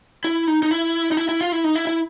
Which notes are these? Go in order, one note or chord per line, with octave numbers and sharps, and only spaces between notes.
E4
D#4
D#4
E4
D#4
E4
E4
F4
E4
D#4
E4
E4